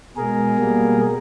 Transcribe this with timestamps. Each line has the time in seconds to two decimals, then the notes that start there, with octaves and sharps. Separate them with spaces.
0.17 B2 G#3 G#4 A#4
0.57 B2 G3 A#3